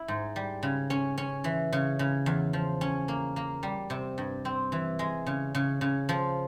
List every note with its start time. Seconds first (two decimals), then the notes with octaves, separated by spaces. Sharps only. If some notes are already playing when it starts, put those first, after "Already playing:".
Already playing: E4
0.08 G#2
0.36 G3
0.63 C#3
0.90 C#4
1.18 C#4
1.44 E3
1.73 C#3
1.99 C#3
2.26 E2
2.53 F3
2.81 C#4
3.08 A#3
3.36 A#3
3.63 G3
3.90 C3
4.18 G2
4.45 C4
4.72 E3
4.99 G#3
5.27 C#3
5.55 C#3
5.81 C#3
6.09 F3